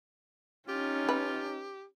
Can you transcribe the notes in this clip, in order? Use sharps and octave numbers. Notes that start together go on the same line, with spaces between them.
C#4 D#4 F4 G4
B4